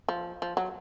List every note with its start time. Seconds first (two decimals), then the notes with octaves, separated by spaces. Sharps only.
0.09 F3
0.42 F3
0.57 F#3